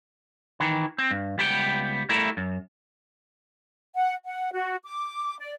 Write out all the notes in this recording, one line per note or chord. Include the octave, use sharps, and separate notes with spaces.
D#3 E3
C4
G2
C#2 G3 B3 G4 F5 G5
G3 A3 E4 A#4 E5
F#2
F#5
F#5
F#4
D6
D5